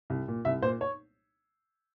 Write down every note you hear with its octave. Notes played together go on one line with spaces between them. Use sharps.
C2
A#2
C2 E5
A#2 C5
C#5